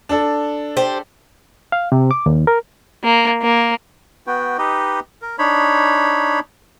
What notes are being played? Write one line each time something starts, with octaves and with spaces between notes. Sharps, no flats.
D4 A4
G4 C5
F5
C3
D6
D#2
A#4
A#3
A#3
B3 F#4 B4 G5
D#4 G4 B4 D#5
A#4
D4 D#4 C#5 B5